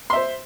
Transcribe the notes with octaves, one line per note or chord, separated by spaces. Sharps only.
C5 E5 C6